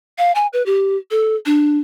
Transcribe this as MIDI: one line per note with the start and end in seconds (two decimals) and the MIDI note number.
0.18 0.32 77
0.35 0.47 80
0.53 0.65 71
0.66 0.97 67
1.11 1.36 69
1.46 1.79 62